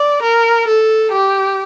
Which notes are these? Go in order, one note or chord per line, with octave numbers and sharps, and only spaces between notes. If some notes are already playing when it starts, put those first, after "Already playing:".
Already playing: D5
A#4
A4
G4